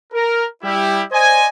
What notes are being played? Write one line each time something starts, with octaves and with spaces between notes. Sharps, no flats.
A#4
G3 E4 G4
C5 D5 D#5 G#5